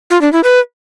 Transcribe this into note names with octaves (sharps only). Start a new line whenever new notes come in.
F4
D4
E4
B4